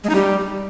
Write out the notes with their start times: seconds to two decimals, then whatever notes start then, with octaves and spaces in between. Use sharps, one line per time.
0.04 G#3
0.09 D#4
0.15 G3